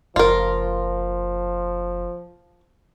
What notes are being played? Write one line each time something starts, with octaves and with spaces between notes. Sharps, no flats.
F#1 F3 F4 A#4